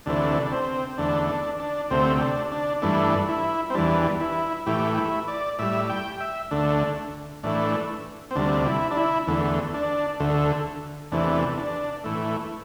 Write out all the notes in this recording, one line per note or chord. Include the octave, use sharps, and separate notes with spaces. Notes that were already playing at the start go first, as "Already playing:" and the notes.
D2 C3 E3 A3 D4
D4
C4
E2 D3 A3 D4
D4
D4
D2 C3 A3 C4
D4
D4
G2 E3 A3 D4
E4
C4
E2 E3 G3 D4
E4
A2 E3 A3 G4
E4
D5
A2 G3 E5
G5
E5
D2 D3 A3 D4
A2 E3 A3 D4
C4
D2 C3 G3 D4
E4
D4
E4
E2 D3 A3
D4
D2 D3 A3
E2 C3 E3 A3 D4
D4
A2 E3 A3